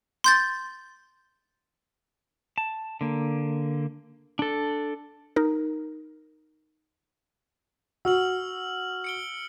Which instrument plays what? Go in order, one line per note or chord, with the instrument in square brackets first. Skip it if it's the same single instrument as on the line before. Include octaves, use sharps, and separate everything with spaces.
[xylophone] C6 G6 A6
[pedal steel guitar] A5
D3 A#3
D4 A4
[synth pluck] D#4 A#4
[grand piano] F#4 [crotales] E6 F6 F#7
[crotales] C#7 D7 G7